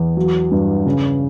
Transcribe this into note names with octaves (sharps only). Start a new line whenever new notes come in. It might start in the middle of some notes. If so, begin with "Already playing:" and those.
Already playing: E2
F#3
G2
C#3